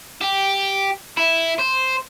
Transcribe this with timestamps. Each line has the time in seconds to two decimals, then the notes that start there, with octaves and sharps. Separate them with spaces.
0.21 G4
1.17 E4
1.59 C5